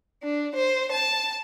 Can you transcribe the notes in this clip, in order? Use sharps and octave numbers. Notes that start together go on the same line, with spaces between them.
D4
C5
A5